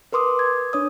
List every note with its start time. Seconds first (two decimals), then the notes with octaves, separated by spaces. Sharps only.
0.12 A#4 B4 C6 D6 D#6
0.39 G#6
0.73 D4 C#5 D#6